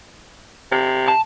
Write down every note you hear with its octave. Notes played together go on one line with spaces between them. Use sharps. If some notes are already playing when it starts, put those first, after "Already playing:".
C3
A5